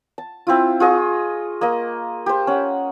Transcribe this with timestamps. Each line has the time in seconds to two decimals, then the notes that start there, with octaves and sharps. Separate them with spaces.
0.18 A5
0.47 C4 E4 F4
0.80 F4 G#4 D#5 C#6
1.61 A#3 D#5
2.26 G4 C5
2.47 C#4 F#5